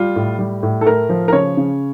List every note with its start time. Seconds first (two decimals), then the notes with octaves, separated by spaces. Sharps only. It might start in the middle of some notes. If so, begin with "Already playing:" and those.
Already playing: G3 F4
0.16 A2
0.39 G3
0.63 A2
0.81 A4
0.86 A3 A#4
1.09 F3
1.28 A#4
1.33 C#3 C#5
1.57 C#3